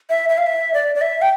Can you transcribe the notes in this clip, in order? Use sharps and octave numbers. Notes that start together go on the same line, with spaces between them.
E5
E5
F5
E5
D5
D5
E5
G5